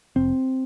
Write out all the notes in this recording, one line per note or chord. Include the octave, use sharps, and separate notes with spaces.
F1 C4